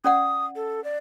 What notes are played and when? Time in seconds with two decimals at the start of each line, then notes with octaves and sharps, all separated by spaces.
0.04 C#4 D5 F#5 D#6
0.56 A4
0.84 D5